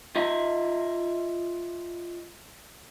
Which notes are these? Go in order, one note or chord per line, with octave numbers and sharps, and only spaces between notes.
F4 D#5 E5